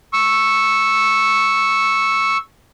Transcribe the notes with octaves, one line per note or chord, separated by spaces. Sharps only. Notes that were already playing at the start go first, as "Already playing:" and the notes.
C#6 E6